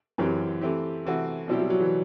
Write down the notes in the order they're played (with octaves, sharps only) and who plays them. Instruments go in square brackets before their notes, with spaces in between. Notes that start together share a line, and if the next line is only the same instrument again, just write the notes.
[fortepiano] F#2 F#3 C4 G4 [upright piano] E3
[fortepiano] E3 A3 C4 E4 G4
C3 E3 A3 C4 F#4
[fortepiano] B2 G3 C4 E4 G4 [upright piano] F#3
[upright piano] F#3
F#3
E3